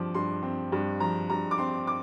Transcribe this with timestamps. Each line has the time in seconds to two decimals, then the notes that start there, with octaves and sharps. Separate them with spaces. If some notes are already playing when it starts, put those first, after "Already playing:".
Already playing: G2 F3 C4 D6
0.15 G2 C6
0.43 C4
0.72 G2
1.00 F3 A#5
1.30 G2 A#5
1.51 D6
1.58 C4 C6
1.87 D6